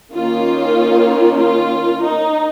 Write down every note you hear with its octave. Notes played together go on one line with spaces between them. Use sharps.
D#3 A#3 C#4 F4
F4
D#4